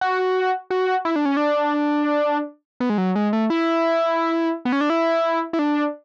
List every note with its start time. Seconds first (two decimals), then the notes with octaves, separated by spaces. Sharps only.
0.01 F#4
0.70 F#4
1.05 E4
1.16 D4
1.25 C#4
1.37 D4
2.80 B3
2.90 G#3
2.98 F#3
3.16 G#3
3.33 A3
3.50 E4
4.65 B3
4.72 C#4
4.81 D4
4.90 E4
5.53 E4
5.59 D4